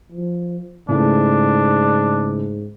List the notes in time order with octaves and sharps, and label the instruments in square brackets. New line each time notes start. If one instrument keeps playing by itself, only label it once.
[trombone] F3
[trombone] G#2 [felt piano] C#3 E3 A3 [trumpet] D4